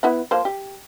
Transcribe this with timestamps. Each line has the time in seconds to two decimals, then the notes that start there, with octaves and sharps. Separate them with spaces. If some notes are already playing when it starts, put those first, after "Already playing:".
0.03 B3 E4 F#5
0.31 F3 A#3 C5
0.45 G4